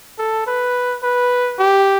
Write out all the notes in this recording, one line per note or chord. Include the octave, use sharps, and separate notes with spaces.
A4
B4
B4
G4